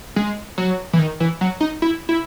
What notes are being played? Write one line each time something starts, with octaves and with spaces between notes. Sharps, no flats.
G#3
F#3
E3
D#3
E3
F#3
D#4
E4
E4